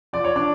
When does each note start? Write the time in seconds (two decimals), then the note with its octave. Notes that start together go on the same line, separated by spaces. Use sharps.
0.13 F3 D5
0.24 C#5
0.36 D4 D5